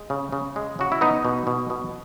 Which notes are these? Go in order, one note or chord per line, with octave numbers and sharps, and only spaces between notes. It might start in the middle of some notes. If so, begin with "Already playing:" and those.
Already playing: G#3
C#3
C#3
G#3
C#3 F#4
E4
B3 D#4
B2
B2
B2